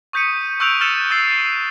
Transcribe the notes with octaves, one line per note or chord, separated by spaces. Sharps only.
C#6 D#6 G6 B6 C#7 D#7
C#6 E6 F#6 G6 D7 F7
E6 F6 A6 C#7 E7
C#6 E6 A6 C7